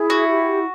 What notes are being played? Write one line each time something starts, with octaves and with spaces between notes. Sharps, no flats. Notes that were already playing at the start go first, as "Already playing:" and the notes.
Already playing: E4 G#4
F#4
G4